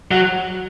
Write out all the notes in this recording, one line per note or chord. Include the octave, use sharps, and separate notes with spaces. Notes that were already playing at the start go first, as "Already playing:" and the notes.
F#3